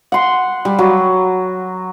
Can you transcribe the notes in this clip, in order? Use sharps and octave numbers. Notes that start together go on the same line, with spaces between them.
F#5 C6
G3
F#3